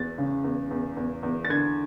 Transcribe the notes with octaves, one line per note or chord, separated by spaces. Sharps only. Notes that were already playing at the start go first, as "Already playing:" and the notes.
Already playing: E2 A6
C#3
E2
E2
E2
E2
A6
D3 G#6